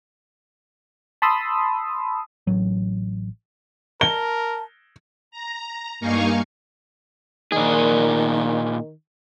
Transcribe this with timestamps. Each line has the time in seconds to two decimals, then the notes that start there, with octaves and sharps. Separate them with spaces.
1.22 A5 B5 C6 D#6 E6
2.47 A1 F#3
4.01 A#4 A5 G7
5.31 A#5
6.00 G2 A#3 D#4 F5 G#5 C#6
7.52 A#2 D#3 G#4